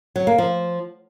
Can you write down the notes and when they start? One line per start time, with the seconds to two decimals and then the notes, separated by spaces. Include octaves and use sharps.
0.16 F#3
0.27 A#3
0.38 F3